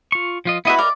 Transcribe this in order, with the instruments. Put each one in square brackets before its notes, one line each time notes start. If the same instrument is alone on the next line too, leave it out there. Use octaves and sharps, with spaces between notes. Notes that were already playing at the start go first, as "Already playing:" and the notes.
[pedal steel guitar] F4 C#6
F3 F4 D#5
[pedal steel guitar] B3 D#5 E5 [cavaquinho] E4 F#4 B4
[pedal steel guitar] A#4 D#5 F6 [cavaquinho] D5